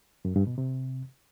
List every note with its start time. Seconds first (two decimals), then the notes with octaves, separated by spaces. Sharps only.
0.25 F#2
0.36 G2
0.47 B2
0.58 C3